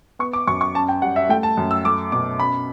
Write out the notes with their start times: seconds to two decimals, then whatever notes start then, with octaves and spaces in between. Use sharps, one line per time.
0.19 B3 C#6
0.33 D6
0.47 F#2 C#6
0.61 C#6
0.75 C#4 A5
0.89 G5
1.02 G3 F#5
1.16 E5
1.29 A3 G5
1.43 A5
1.57 F#2
1.71 E6
1.85 A3 D6
2.12 B2 D6
2.39 C#4 B5